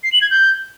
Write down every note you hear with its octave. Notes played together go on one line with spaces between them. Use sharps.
C7
F#7
G#6
G6